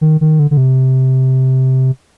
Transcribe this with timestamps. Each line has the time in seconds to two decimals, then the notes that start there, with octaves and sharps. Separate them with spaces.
0.01 D#3
0.21 D#3
0.39 D3
0.51 D3
0.57 C3